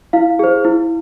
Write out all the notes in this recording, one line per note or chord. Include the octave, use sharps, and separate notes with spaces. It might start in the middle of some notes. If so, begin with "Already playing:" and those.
E4 F5
G#4 C5
E4